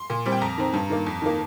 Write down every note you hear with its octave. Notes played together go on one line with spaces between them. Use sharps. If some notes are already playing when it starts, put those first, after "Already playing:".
Already playing: C6
A#2
G3 C4
G5
F2 A#5
D#3 C4
G2
D#3 A#3
F2
D#3 A#3